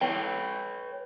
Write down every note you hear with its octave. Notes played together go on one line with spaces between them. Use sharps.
B4 C#5 G5